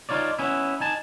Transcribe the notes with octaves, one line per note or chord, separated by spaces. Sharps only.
D#4 F4 C#5 D5
B3 C#4 E4
D#4 G#5 A5